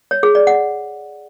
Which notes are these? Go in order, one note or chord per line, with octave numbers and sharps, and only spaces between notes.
C#5
G#4
D5
F#5